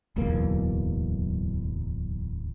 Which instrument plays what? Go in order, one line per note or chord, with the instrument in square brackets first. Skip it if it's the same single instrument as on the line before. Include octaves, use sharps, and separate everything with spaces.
[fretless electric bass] D1 B1 E2 A#3